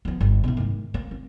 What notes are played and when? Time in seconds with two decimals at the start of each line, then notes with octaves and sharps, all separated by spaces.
0.05 F3 B3
0.21 G1
0.44 B2 E4
0.57 G#2 D#3
0.94 A#3
1.11 C4